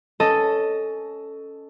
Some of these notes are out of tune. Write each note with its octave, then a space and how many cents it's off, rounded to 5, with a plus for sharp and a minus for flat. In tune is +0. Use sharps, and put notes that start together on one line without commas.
C#4 +15 A4 +0 D#5 +0